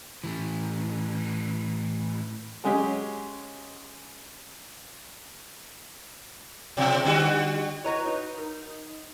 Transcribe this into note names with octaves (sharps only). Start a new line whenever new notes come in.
A2 E3
F#3 G#3 C#4 G4 G#4
B2 F3
D3 G3 F#4
E4 F#4 B4 C#5 D#5 A#5
D#4
A#4